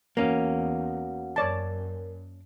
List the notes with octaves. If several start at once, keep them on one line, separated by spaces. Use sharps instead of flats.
E2 A#3 C#4 F#4 F5 F#5
F#2 A#4 C#5 D5 A5